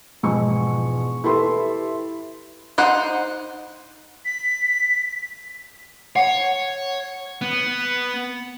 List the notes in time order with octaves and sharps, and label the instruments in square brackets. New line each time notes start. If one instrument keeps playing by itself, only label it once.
[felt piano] E1 G#2 F3 D#5 G#5 C#6
E4 G4 A4 B4 E5 C6
[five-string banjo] D#4 C5 F#5
[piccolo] B6
[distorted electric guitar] C#5 [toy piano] F#5
[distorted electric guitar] B3